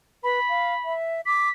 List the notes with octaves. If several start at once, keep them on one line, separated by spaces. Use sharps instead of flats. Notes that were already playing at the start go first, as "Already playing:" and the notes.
B4 B5
F5
E5
D6 B6